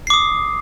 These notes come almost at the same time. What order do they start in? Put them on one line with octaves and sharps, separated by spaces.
C7 D6 D#6